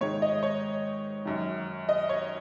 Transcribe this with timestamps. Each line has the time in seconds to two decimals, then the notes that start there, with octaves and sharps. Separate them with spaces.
0.01 G#2 D#3 C#5
0.22 D#5
0.43 C#5
1.25 F#2 D#3
1.89 D#5
2.09 C#5